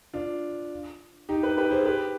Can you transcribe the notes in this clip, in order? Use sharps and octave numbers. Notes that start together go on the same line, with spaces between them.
D4 F4
D#4 G4
G4 B4
G4 B4
G#4 C5
G4 B4